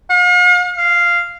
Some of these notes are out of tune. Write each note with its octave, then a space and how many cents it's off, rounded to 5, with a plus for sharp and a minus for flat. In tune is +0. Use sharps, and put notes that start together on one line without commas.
F5 +45
F5 -5